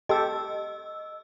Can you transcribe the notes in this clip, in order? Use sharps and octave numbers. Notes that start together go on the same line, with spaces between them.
G4 A4 D#5 C6 E6